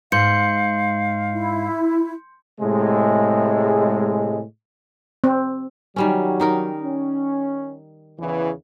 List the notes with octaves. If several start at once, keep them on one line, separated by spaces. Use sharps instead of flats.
G#2 F5 C6 G6 C#7
E4
A2 C3 G#3
C4
D#3 F#3 G3 C#4
D#3 D#4 A#4
C#4
E2 C#3 E3